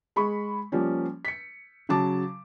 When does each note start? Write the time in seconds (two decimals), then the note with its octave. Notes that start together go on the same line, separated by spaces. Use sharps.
0.16 G#3 B5 C#6
0.72 F3 G3 A#3 C#4
1.25 B6 C#7
1.89 C#3 F#3 A5 D6